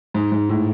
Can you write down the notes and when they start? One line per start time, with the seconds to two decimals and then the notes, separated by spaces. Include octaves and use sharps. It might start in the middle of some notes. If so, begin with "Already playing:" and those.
0.14 G#2
0.32 G#2
0.49 A2